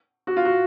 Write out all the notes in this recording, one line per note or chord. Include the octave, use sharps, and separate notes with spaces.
F#4
F4
F#4